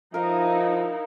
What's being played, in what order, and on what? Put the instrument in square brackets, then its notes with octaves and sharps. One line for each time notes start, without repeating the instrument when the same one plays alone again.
[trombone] F3 [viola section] D#4 E4 [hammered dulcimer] A#4 F5 [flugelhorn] D#5